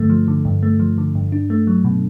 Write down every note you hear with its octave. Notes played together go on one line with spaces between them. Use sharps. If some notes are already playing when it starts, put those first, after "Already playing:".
Already playing: G2 D3 A3
F3
D3
G2
A3
F3
D3
G2
D4
A3
F#3
B2